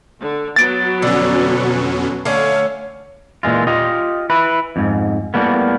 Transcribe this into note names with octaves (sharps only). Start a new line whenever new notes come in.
D3
F#3 B3 A6 D7
F2 B2 D3 C#4
D3 A3 C#4 F5
A#2 E3 G#3 F4
F4 G4 D#5
E4 B4
F2 G#2
A2 G3 A#3 B3